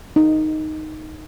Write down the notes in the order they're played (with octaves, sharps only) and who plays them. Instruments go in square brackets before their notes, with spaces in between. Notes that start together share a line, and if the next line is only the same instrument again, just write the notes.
[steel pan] D#4